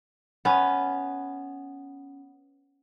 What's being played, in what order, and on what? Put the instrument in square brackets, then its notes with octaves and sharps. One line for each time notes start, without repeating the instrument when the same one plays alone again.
[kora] B3 C#4